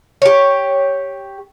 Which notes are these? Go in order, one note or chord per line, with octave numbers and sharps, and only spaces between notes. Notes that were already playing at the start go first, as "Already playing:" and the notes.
G4 C#5